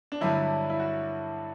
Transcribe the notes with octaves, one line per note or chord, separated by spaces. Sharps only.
D4
G2 D3 F#3 E4
E4
F#4